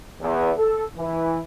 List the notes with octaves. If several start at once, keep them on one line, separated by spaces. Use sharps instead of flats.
E2
A4
E3